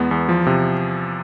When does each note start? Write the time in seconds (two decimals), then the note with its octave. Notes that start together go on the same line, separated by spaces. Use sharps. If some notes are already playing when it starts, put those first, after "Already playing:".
Already playing: E2 G#3 B3
0.11 E2
0.29 F3
0.47 C3